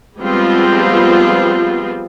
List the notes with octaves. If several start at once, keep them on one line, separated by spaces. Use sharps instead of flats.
F3 G3 G#3 B3 C4 F4